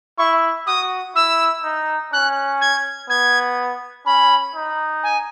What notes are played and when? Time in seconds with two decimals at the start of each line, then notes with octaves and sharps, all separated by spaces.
0.18 E4 C#6
0.67 F#4 D#6
1.16 E4 E6
1.64 D#4
2.13 C#4 F#6
2.61 G#6
3.09 B3 G#6
4.06 C#4 B5
4.55 D#4
5.03 G#5